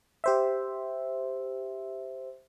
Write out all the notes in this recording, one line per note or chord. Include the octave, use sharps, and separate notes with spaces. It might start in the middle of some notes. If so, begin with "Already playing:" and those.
G4 C5 E5